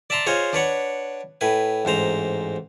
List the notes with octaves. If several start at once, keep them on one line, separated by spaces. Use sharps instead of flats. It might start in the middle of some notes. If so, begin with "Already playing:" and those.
D5 E5 A5 A#5 C6
F4 G#4 C5 C#5 D#5
D4 B4 C#5 F#5
A2 B4 G#5
A1 G#2 C5 A#5